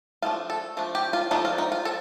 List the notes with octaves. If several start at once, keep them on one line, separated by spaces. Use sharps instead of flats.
F3 A3 D4 F4
A4
F3 A3 D4
G4
F4
F3 A3 D4 D#4
F4
D#4
F4
F3 A4